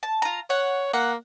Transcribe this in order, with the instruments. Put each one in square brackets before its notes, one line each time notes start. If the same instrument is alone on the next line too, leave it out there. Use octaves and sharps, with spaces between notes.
[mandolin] A5
F4 A#5
[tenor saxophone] C#5 [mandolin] F#5
[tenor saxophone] A#3 [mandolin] F#5